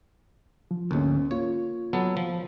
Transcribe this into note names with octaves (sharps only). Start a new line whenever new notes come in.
F3
D2 G#2 A#3 B3 C#4
A#3 F4 C#5
F#3 B3 A4
F3